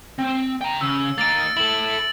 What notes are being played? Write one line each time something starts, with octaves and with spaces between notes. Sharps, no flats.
C4
G5 A#5
C#3 E6
A#3 D#4 A6 D7
E4 A4 F#7